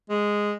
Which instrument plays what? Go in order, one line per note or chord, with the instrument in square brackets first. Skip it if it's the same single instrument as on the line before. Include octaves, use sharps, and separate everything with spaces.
[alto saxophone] G#3